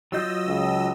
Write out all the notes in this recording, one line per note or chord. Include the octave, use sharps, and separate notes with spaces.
F#3 F4 D#5 E6 G6
C#2